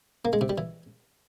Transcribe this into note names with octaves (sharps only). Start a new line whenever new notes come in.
A#3
G#3
C3
G3
E3